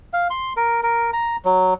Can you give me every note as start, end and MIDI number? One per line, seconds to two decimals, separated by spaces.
0.13 0.28 77
0.30 0.53 84
0.57 0.81 70
0.83 1.11 70
1.13 1.36 82
1.45 1.74 54